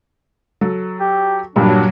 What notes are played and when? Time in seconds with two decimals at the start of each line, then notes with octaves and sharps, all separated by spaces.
0.61 F#3 A4
1.00 G4
1.56 G2 A#2 F#3 G3 D4